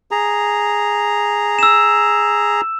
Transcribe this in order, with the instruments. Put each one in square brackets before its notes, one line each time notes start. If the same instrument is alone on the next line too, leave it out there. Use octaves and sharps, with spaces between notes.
[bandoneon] G#4 A#5
[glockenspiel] E6 E7